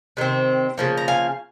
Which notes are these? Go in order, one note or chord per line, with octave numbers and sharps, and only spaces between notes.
C3 D#3 C4
C#3 F3 A#3
A#5
F5 G#5